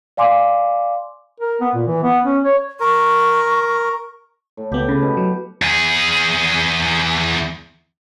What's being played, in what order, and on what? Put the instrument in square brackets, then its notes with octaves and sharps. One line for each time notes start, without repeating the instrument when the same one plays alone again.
[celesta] D5 F5 G#5 C6 D6
[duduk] A#4
B3
A#2
E3
B3
C#4
C#5
[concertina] A#4 [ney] C#6
[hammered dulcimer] A2
[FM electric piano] C#2 B3 [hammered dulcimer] G4
[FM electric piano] C#3 [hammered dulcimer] B4
[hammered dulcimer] B2
[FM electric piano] F#3
[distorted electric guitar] E2 G#4